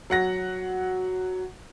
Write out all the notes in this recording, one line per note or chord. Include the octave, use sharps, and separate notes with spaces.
F#3 F#5 A#6